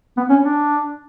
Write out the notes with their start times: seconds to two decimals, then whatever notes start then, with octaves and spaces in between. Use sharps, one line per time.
0.17 B3
0.30 C#4
0.43 D4